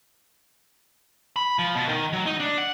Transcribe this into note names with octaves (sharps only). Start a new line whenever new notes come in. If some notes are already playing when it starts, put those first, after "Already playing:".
B5
F3
B2
D#3
F#3
D#4
D4
F#5